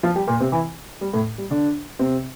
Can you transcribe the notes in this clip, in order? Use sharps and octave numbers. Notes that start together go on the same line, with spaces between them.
F3 F4
G3 G4
A#2 A#3
C3 C4
E3 E4
G3
A2 A3
G3
D3 D4
C3 C4